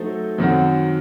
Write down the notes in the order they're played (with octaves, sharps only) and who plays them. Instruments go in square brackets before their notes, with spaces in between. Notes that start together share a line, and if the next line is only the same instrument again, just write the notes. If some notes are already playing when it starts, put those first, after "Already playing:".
Already playing: [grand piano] F#3 A3 D#4 A4 C5
F#2 D#3 F#3 C4 F#4